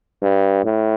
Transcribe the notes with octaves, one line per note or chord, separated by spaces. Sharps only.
G2
A2